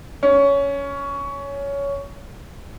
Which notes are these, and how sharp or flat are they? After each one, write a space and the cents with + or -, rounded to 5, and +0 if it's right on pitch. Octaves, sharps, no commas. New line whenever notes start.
C#4 +15